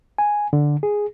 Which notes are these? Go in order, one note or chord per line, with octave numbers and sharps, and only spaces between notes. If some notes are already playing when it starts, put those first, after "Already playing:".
G#5
D3
G#4